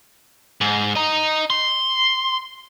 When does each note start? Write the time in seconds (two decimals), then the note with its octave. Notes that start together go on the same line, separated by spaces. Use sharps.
0.61 G#2
0.95 D#5 A#5
1.50 C6